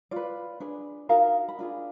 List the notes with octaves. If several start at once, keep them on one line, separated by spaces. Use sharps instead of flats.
F4 B4 D5
D4 G#4 B4
D#4 F#4 A#4 F5
B5
D4 F4 G#4